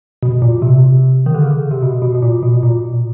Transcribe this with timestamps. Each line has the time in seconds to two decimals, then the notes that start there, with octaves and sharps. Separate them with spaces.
0.23 B2
0.42 A#2
0.62 C3
1.26 D#3
1.35 D3
1.42 C#3
1.71 C3
1.82 B2
2.02 B2
2.15 B2
2.22 A#2
2.43 B2
2.63 A#2